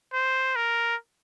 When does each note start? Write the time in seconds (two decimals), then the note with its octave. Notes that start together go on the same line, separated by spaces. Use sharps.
0.13 C5
0.56 A#4